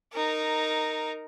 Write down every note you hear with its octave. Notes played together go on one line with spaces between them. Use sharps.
D#4 A#4